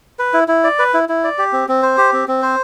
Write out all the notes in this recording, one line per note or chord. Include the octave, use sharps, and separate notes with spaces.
B4
E4
E4
D5
B4
E4
E4
D5
G4
C4
C4
C5
G4
C4
C4
C5